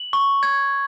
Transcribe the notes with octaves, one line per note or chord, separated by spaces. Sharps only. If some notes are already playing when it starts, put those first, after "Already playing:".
Already playing: F#7
C#6
G#6